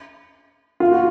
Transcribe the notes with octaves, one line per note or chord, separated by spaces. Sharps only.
F4
F#4